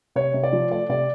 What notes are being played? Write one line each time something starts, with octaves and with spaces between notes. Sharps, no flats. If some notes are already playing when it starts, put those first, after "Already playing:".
C3 C#5
C3
D5
F3
A3 D5
C3 D5